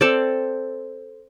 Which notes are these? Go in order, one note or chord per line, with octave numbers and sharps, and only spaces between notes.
C4 A4 D5